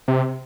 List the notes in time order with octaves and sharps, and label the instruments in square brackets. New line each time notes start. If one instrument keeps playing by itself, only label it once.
[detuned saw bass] C3